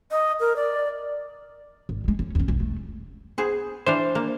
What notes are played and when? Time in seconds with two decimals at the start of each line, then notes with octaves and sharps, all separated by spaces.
0.11 D#5
0.40 A#4
0.56 D5
1.89 G#1
2.04 B2 G#3
2.19 C#4
2.35 E2 C#4
2.48 B1 F2
2.60 A3
3.38 B3 G#4 C5
3.86 E3 D4 C5 F5
4.15 A#3